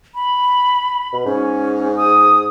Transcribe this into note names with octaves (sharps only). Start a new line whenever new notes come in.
B5
B2
G#2 C#4
D#6